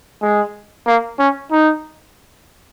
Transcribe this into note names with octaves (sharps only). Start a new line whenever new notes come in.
G#3
A#3
C#4
D#4